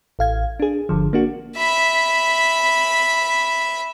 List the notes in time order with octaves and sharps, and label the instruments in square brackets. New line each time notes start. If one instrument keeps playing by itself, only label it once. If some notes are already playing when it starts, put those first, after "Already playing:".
[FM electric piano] A1 F5 G#6
D4 G#4
G1 D3 F3
A#3 D4 F#4
[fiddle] E5 B5